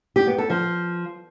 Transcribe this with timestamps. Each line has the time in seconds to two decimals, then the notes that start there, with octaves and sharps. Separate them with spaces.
0.16 G4
0.27 B3
0.38 A4
0.50 F3